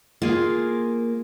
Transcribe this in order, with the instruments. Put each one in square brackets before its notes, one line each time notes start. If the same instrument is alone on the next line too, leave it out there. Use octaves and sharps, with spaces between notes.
[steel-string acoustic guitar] A#3 [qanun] F4 G#4 F5